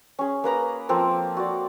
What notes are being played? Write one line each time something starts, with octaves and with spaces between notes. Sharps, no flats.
C#4 G#4
A#3 B4 A#5 D#6
F3 A#3 C4 A4
F#4 D5